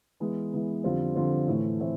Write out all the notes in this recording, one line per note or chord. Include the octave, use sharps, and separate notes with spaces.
E3 G#3 B3
E3 G#3 B3
F2 D3 G3 C4 F4
F2 D3 G3 C4 F4
A2 E3 A3 C4
A2 E3 A3 C4